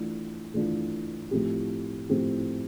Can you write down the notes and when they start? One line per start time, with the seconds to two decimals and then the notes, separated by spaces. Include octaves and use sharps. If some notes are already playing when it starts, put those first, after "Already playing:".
Already playing: E3 A3 D4 F4
0.54 E3 A3 D4 F4
1.31 A2 F3 A3 C4 G4
2.09 A2 F3 A3 C4 G4